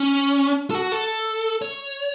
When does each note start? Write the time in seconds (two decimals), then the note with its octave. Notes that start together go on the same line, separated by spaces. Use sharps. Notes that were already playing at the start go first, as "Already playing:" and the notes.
Already playing: C#4
0.70 A4
0.75 F#4
0.92 A4
1.62 C#5